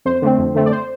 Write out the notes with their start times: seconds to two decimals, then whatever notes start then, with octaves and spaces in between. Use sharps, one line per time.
0.05 F2 C5
0.22 D3 A3 C4
0.39 F2
0.55 D3 A3 C4
0.66 D5
0.72 C5